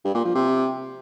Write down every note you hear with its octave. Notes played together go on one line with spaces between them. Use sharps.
G2
A#2
F3
C3